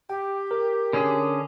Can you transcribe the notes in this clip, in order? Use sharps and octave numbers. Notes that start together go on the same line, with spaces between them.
G4 G5
A#4
D3 C#4 G#4